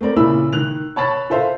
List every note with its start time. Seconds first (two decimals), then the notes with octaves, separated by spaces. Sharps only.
0.01 A3 C4 A#4 D5
0.16 A#2 C#3 E4 B5 E6
0.53 D#3 F#6 F7
0.96 C#5 A5 B5 A6
1.30 F4 A4 C5 E5 F5